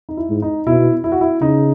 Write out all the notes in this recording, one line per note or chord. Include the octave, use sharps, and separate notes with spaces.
D#4
E4
G#2
D#4
B2 E4
E4
F#4
E4
C#3 D#4